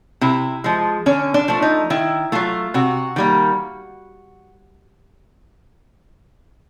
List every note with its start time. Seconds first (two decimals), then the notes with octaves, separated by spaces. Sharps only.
0.21 C3 E4
0.64 F3 G#3
1.06 D3 C#4
1.34 D4
1.48 F3 A3
1.62 D#4
1.90 D#3 E4
2.32 F#3 A3 F4
2.74 C3 F#4
3.16 D#3 G3 A#3